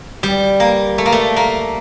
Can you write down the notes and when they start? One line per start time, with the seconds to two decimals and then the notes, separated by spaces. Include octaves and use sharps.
0.23 G3
0.60 A#3
0.98 A3
1.06 A#3
1.12 A3
1.36 A#3